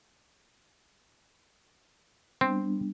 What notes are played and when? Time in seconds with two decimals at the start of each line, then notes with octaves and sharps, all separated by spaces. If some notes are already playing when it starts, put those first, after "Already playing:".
2.41 G3 B3 C4 D4